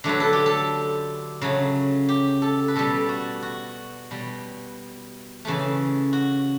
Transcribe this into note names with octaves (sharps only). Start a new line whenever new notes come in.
D3 F#3 A3 B4
A4
G4
A4
C#3 F#3 A3
G4
A4
B4
B2 G3 A4
F#4
F#4
B2 G3
C#3 E3 A3
F#4